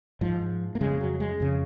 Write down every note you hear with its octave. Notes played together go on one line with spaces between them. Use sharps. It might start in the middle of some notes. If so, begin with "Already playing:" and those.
G#2 F3
A#3
F2 C#3 G#3
F#3
G#3
F2 C#3